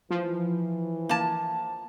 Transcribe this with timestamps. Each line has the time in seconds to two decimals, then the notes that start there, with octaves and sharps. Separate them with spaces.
0.11 E3 F3
1.09 A#3 A5